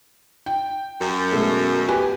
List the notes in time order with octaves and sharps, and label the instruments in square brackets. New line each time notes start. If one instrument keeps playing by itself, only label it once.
[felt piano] G5
[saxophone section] F#2
[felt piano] B2 G#3 A3
G4 B4 G#5